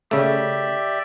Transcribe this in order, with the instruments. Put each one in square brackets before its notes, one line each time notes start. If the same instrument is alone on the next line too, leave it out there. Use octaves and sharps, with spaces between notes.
[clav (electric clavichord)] C#3 A3 [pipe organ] G4 D5 E5